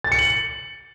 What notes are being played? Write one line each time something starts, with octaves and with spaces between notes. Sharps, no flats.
A6
C#7
F#7